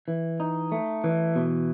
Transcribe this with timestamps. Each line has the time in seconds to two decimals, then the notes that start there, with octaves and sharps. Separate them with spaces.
0.08 E3
0.40 D#4
0.72 A3
1.04 E3
1.36 B2